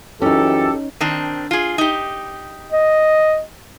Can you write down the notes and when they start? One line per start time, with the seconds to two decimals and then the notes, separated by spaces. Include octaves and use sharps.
0.22 F#2 E3 C#4 D#4 G4 A4
1.00 D#3 C4 D4
1.51 F4 G#4
1.78 D#4 G4
2.73 D#5